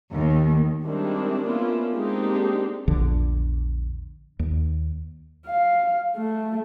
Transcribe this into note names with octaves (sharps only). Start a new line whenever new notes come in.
D#2
D#3 G3 G#3 C4 D4 E4
A#3 B3 C#4 D4 E4 F4
G#3 A#3 C4 D4 D#4 G4
A#1 E2 D3
D#2
F5
A3